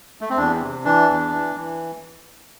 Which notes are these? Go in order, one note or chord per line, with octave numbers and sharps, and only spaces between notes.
A3
C4
E2 D4
C3
E3 D4
E2
E3
E3